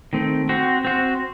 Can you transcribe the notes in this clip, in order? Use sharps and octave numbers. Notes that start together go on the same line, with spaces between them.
D#3 A3 C4
C4 F#4 C5
C4 F#4 C5